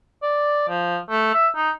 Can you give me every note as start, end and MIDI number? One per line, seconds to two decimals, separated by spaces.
0.23 0.67 74
0.69 0.98 53
1.10 1.32 57
1.34 1.48 76
1.56 1.71 63